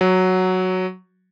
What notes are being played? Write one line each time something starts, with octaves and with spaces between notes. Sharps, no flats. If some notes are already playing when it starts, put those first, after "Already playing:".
F#3